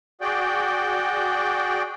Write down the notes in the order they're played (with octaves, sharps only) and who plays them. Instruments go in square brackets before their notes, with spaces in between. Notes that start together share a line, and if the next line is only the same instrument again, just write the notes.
[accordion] F#4 G#4 D5 G5